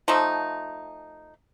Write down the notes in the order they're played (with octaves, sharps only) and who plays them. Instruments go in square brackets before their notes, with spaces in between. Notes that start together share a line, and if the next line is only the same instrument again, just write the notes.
[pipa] F3 A3 D#4